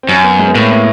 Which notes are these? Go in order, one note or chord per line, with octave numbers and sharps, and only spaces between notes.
C4
F#2 C#4
B3
G#3
B3
A2 A#3
B3